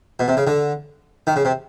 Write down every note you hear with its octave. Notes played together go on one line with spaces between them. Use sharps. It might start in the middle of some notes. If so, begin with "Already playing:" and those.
B2
C3
C#3
D3
D#3
C#3
C3